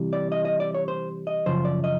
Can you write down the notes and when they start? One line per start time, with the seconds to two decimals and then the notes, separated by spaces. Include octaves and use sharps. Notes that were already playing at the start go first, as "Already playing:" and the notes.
Already playing: C3 E3 G3
0.13 D5
0.32 D#5
0.45 D#5
0.60 D5
0.75 C#5
0.88 C5
1.27 D#5
1.46 F#2 C#3 F3 C5
1.65 D5
1.84 D#5